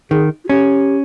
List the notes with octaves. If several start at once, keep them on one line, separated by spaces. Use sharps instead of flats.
D#3 G#4
F4
C#4 G4